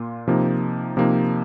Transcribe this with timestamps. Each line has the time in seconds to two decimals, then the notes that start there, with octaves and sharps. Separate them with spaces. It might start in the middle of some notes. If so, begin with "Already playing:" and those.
Already playing: A#2 A#3 F4
0.27 C3 F3 A#3 D#4
0.97 C3 F3 A#3 D#4